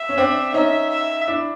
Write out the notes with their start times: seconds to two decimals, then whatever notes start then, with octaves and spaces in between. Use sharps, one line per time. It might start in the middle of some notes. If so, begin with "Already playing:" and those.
Already playing: E5
0.09 C#4
0.18 C4 D4
0.53 C#4 D#4 E5
0.90 E5
1.28 D4 E4